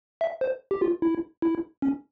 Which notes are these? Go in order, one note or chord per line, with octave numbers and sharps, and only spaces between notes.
E5
C5
G4
F4
E4
E4
C#4